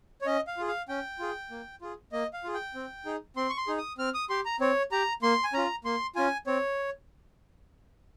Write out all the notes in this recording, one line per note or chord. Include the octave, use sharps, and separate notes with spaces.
C#5
C#4 D#5
F5
F4 G#4
F5
C#4 G5
F4 G#4
A#3
F4 G#4
A#3 D#5
F5
F4 G#4
G5
C4
D#4 G#4
C4 C6
C#6
C6
D#4 G#4
D#6
C4 F6
D#6
G4 C6
A#5
C4 C#5
G4 A#5
A#3 C6
G#5
C#4 F4 A#5
A#3 C6
C#4 F4 G#5
C4 C#5